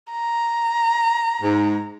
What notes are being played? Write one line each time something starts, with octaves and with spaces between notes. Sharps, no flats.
A#5
G#2